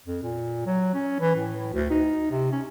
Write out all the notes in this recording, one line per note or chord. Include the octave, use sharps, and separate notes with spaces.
F2
A#2
F#3
C#4
E3
A2
D2
D#4
C3
C#4